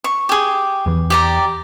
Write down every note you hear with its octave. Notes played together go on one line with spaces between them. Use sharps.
C#6
G4 G#4
E2 E3
G4 D5 A#5